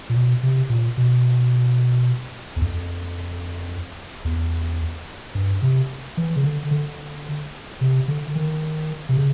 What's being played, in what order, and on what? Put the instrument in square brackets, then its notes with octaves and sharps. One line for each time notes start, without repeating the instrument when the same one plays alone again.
[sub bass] A#2
B2
C3
A#2
B2
E2
F2
E2
G2
C3
E3
C#3
D3
D3
C3
D3
D#3
C3
C#3